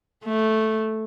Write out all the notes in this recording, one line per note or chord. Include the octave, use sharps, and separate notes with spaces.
A3